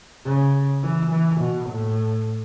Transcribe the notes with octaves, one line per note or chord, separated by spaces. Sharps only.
C#3
E3
E3
B2
A2